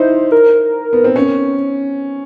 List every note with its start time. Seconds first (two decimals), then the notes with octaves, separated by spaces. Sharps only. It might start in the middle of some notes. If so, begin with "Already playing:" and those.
Already playing: D#4 E4 C5
0.32 A#4
0.93 B3
1.04 C4
1.16 C#4